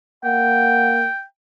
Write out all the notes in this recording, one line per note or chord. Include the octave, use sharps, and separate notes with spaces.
A#3 F#5 G5